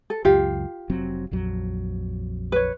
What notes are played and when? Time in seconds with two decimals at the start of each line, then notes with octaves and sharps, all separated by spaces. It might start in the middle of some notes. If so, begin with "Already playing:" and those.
0.10 A4
0.25 C#2 F#2 F4 G4 F5
0.90 F1 F#3 C4
1.31 A#1 F2 F#3
2.52 B4 C#5